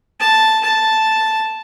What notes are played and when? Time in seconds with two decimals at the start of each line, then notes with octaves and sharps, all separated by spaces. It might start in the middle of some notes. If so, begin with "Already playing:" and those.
0.20 A5
0.63 A5